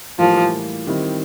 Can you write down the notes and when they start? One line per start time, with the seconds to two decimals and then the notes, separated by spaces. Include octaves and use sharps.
0.19 A2 E3 F3 G3 A#3
0.87 D#3 G3 C4 E4